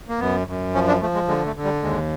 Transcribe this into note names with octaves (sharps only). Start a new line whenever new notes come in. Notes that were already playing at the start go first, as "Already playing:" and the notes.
A#3
F#2 B3
F#2
F3 C#4
D4
F3 A3
G#3
D3 G#3
A3
D3
G3
D#2 G#3